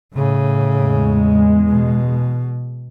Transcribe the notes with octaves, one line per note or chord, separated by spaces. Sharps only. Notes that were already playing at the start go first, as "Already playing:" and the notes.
A2 C#3
E2 G#3
B2